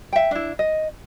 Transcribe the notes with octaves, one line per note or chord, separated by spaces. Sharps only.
E5 G5
D4 E4
D#5